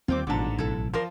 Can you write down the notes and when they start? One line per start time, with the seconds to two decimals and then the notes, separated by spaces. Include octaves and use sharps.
0.08 D#2 D#3 G3 C4 F4 G5 D6
0.27 A1 G#2 B2 D3 F3 A5 D6
0.58 B1 E4 A4
0.93 F3 A#4 D5 C6